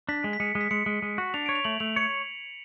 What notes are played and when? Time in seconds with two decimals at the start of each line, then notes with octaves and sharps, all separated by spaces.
0.09 D4 B6
0.24 G#3
0.33 B6
0.40 G#3 C#7
0.55 G#3
0.61 B6
0.71 G#3 C#7
0.86 G#3
1.02 G#3
1.18 F#4
1.34 D4 F7
1.46 C#5 D7
1.55 F7
1.64 A3 F#7
1.80 A3 F7
1.96 C#5 C#7